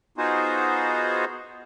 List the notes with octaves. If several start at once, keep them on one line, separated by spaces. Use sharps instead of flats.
B3 D#4 F4 F#4 G#4 C5